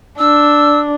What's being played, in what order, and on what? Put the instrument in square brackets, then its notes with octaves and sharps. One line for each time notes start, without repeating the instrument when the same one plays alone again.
[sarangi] D4 [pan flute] E6